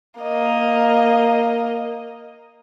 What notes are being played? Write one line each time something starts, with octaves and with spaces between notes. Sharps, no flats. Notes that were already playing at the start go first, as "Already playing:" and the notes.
A#3 D#5